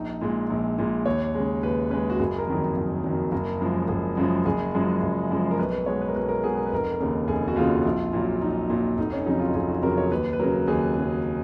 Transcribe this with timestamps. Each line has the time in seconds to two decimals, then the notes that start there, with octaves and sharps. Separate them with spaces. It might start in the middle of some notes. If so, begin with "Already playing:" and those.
Already playing: A#1 D#4
0.21 A#2 G#3
0.50 A#1
0.78 A#2 G#3
1.06 D#2 C#5
1.35 C#3 G#3
1.63 D#2 B4
1.91 C#3 G#3 B4
2.10 F#4
2.19 F#1 G#4
2.38 A#4
2.47 F2 D#3 F#3
2.76 F#1
3.04 F2 D#3 F#3
3.32 F#1 A#4
3.61 F#2 C#3 F3 G#3
3.88 F#1
4.17 F#2 C#3 F3 G#3
4.45 F#1 G#4
4.74 F#2 F3 G#3
5.02 F#1
5.31 F#2 F3 G#3
5.51 A#4
5.59 B1 B4
5.72 B4
5.86 B2 G#3 C#5
6.01 B4
6.08 A#4
6.16 B1 B4
6.29 A#4
6.44 B2 G#3 G#4
6.57 A#4
6.67 B4
6.72 F1 A#4
7.00 D#2 C#3
7.28 F1 G#4
7.48 F#4
7.56 D#2 C#3 F4
7.85 A#1
8.13 A#2 F#3
8.42 A#1 D#4
8.70 A#2 F#3
8.97 F1 D#4
9.12 C#4
9.26 F2 C#3 F#3 D#4
9.40 F4
9.55 F1 G#4
9.69 F#4
9.82 F2 C#3 F#3 A#4
9.98 C#5
10.11 D#2 B4
10.33 B4
10.39 C#3 F#3 A#4
10.68 D#2 G#4
10.96 C#3 F#3